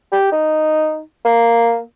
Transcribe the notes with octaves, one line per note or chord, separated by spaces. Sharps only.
G4
D#4
A#3